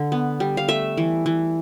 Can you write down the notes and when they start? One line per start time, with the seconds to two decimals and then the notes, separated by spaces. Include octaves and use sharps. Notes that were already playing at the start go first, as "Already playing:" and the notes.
Already playing: D3
0.12 B3
0.40 G3
0.57 F5
0.68 A3 E5
0.97 E3
1.26 E3